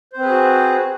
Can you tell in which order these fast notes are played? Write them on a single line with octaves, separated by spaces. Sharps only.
C5 C4 B4 G#4 F#4